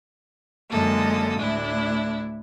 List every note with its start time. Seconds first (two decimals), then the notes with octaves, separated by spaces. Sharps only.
0.69 F#2 D3 G#3 A#3 A4 D#6
1.40 D2 A2 D4 E4